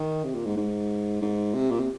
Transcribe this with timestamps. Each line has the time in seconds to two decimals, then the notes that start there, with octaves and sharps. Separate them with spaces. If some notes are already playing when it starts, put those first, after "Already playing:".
Already playing: D#3
0.24 C3
0.35 A#2
0.46 G#2
0.56 G#2
1.22 G#2
1.54 C3
1.71 A#2
1.80 C3